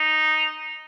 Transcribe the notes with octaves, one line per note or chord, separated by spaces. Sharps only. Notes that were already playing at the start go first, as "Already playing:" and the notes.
Already playing: D#4